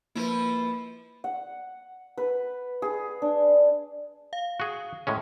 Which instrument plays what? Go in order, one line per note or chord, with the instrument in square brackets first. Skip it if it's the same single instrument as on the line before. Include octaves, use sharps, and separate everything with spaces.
[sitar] F3 E4 [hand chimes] A#3 B4
[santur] F#5
B4
G#4
D4
[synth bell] F5
[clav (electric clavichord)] F#4 G#4
A2 G#3 C#4